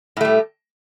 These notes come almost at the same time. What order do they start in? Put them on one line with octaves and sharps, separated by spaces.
A2 A3 G3